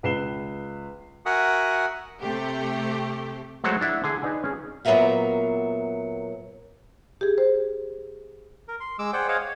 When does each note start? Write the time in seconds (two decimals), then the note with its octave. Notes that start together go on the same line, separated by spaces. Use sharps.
0.03 C#2 B4 C7 E7 G7
1.26 F#4 A#4 E5 F#5 G#5 D#6
2.22 C3 A3 G4
3.64 F#3 G#3 A3 F#4 C5 C#5
3.81 D4 E4 F#5
4.04 D3 G#4
4.23 D#4 B4 D5 G#5
4.43 C#4 G#4
4.85 A#2 F#3 B3 A#4 E5 F5
7.21 G4 G#4
7.38 C5
8.68 A#4
8.80 C6
8.99 G#3 D6 E6
9.13 G#4 C5 D5 F#5 G5
9.28 G#4 C5 C#5 D#5 F5 F#5
9.41 C#5